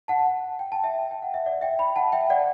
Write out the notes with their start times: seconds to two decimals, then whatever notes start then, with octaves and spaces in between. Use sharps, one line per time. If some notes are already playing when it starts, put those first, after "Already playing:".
0.08 F#5 A5
0.59 G5
0.72 A5
0.84 E5 G5
1.11 G5
1.22 F#5
1.34 E5
1.46 D5 F#5
1.61 E5 G5
1.79 G5 B5
1.96 F#5 A5
2.12 E5 G5
2.30 D5 F#5